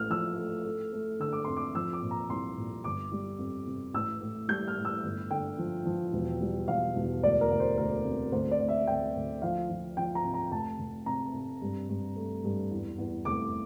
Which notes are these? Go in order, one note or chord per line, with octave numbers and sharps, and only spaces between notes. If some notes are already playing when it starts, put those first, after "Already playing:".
Already playing: A1 A3 F6
F3 E6
A3
A3
A3
D3 E6
D6
F2 C6
D6
F3 E6
D6
A#2
A#5
C2 C6
A#2
G1 D6
G3
F2
C3
A1 E6
A2
G3 G6
F6
A2
E6
G1
D3 G5
F3
F3
E1
G3
E1 F5
E1
D2 D5
A#4
D2
C5
D2 A#4
C3
D2 C5
D5
D2
E5
D2 G5
D2
F3 F5
F3
F3 G5
A#5
C3
A#5
F1 A5
F1
C3 A#5
C3
G2
G2
A3
G2
E2
E2
F1 D6